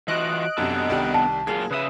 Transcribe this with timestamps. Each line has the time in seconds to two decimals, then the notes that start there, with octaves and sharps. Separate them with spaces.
0.08 E3 F4 F#4 D#5 F#6 D7
0.58 F#2 C3 B3 D4 A4
0.90 C2 D#3 G3
1.14 A5
1.47 F#2 A#3 F4 G#4
1.71 C#3 B4 C#5 E5 D#6